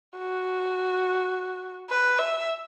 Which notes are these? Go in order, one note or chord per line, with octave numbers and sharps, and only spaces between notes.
F#4
B4
E5